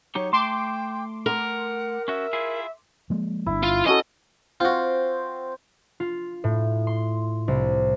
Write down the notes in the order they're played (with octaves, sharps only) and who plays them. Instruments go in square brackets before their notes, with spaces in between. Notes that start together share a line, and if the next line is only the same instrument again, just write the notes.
[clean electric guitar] F#3 D#4 G4 [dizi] C#5
[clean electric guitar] A3 A5 [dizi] G5 [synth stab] C6 D6
[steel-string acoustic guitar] A#4 [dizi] F#5
[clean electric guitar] C#4 F#4 [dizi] E5
[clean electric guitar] E4 F4 G#4
[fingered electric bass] F3 G#3 A#3
[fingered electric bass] G1 G2 [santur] E4
[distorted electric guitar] F4
[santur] C#4 F#4 A4 [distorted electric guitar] D#5
[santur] C4 [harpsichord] F4 F#4
[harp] F4
A2
C6
C2